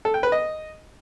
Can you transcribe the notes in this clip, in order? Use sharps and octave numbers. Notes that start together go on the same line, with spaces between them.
A4
G5
B4
D#5